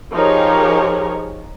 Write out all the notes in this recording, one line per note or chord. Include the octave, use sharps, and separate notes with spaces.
F3 D#4 G4 G#4 A#4 C#5